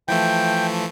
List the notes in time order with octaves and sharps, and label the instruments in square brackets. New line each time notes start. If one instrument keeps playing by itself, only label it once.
[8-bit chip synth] E3 F3 A3 [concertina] G5